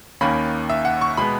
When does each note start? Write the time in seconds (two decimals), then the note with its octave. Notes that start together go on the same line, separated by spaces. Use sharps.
0.21 D#2 D#3 A#3 C#4 B5
0.70 E5
0.85 F#5
1.01 C#6
1.17 B2 G#3 B3 B5